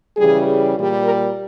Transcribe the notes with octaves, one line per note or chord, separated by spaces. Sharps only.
C#3 E3 G3 G#4
A#2 G3
A#4